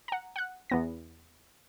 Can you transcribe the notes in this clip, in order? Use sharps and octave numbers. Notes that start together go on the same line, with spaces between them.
F#5 A#5
F#5 F#6
E2 B3 A#6